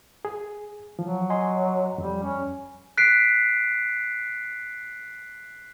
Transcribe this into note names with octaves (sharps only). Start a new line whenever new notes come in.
G#4
F3 F#3
D#5 G#5 C6
F2 G3
C#4
F#6 B6 C7 D7